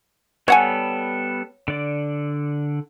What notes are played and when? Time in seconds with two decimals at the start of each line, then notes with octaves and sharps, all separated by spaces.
0.48 G3 B3 A4 C#5 F#5 G#5
1.68 D3 D5